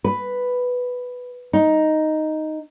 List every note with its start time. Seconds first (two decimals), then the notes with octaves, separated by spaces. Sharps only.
0.04 B4
1.53 D#4